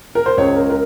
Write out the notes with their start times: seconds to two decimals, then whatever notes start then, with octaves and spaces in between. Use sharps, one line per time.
0.15 A#4
0.26 C5
0.37 C#2 C#5
0.56 A#4
0.70 A#4